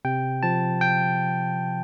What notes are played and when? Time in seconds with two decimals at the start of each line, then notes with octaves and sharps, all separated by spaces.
0.05 C3 G5
0.43 F3 A5
0.81 G5